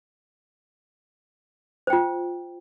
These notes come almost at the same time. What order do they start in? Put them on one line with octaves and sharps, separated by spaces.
C5 G5 F4